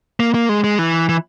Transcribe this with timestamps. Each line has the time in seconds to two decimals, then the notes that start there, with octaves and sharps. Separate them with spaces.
0.20 A#3
0.34 A#3
0.49 G#3
0.64 G#3
0.79 E3
1.09 E3